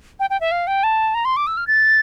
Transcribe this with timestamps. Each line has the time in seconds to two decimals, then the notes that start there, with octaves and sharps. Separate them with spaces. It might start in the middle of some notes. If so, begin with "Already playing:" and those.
0.20 G5
0.30 G5
0.40 E5
0.51 F5
0.67 G5
0.83 A5
1.14 A#5
1.25 C6
1.36 D6
1.47 E6
1.57 F6
1.67 A6